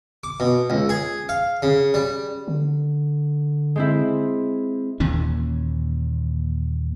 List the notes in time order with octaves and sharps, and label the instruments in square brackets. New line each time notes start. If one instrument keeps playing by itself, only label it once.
[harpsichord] D6
B2
C#2
G#4
F5
C#3
G3
[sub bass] D3
[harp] G#3 C4 E4
[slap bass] D#2 A#2 E3 C#4